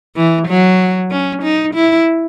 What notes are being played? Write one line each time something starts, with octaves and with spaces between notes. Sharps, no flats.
E3
F#3
C#4
D#4
E4